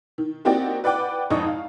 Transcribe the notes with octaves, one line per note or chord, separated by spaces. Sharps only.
D#3
A#3 C4 D#4 F#4 G4 D5
B4 D5 F#5 G5 D6
G#1 F2 D4 D#5 C#6 D#6
F5